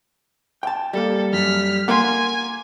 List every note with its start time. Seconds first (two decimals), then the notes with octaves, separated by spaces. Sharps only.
0.63 G5 A5
0.93 G3 A#3 A4
1.33 F#2 F6 B6
1.88 A#3 F#5 G#5 C6